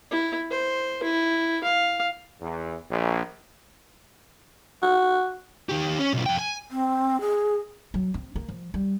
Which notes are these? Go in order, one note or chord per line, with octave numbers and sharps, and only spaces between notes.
E4
C5
E4
F5
E2
A#1
F#4
D#3 G4
C#4
B1 F4
F2 G5
G#5
C4
G#4
F#3
C4
A#3
F3
G3